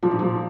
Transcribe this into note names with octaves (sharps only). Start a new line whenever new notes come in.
A#2 F3
G#2
A#2 F3